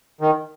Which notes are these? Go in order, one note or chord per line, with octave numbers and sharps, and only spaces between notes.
D#3